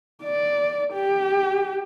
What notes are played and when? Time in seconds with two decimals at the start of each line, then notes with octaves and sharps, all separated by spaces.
0.23 D5
0.93 G4